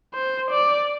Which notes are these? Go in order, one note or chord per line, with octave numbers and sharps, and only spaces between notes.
C5
D5